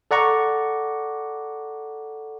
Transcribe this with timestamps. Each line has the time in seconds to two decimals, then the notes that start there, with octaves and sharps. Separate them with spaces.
0.11 A4 D5 F#5 A#5 C#6